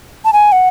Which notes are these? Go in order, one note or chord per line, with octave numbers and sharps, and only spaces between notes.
A5
G#5
F#5